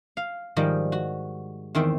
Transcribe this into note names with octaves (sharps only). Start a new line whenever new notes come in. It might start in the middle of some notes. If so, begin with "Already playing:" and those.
F5
G#2 D#3 F3 G3 D#5
F#4
E2 D#3 C4 E5